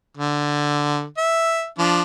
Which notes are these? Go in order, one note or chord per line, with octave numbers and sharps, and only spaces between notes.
D3
E5
F3 D4